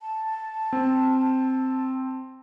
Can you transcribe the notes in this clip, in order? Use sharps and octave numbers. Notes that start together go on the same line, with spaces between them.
A5
C4